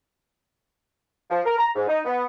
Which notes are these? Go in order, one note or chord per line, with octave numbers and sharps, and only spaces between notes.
F3
A#4
A#5
G#2
D#4
B3